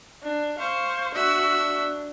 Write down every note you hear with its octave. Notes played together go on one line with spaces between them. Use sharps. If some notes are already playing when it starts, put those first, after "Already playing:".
D4
C5 F5 C#6
D4 F#4 E5